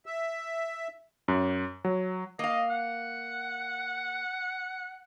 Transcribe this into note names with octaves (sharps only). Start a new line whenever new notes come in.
E5
F#2
F#3
A#3 D#5 F5
F#5